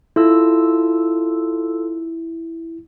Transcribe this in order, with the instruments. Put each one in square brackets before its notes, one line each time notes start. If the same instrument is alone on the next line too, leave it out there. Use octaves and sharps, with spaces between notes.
[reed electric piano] E4 [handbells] F4 A4 E6